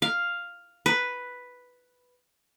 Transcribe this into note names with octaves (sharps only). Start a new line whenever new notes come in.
F5
B4